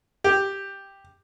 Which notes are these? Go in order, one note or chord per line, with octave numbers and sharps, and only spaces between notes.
G4